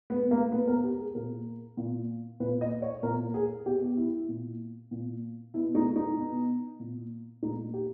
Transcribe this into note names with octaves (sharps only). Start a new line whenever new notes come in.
B3
A#3
B2 B3
A#4
G4
G#4
A#2 A#4
A#2
A#2 B4
D#5
C#5
A#2 A#4
G#4
B2 G4
E4
A#2
A#2
B2 E4
D#4
D#4
B2
A#2
A#2 D#4
G4